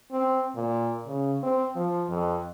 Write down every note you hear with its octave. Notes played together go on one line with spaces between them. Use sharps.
C4
A#2
C#3
C4
F3
F2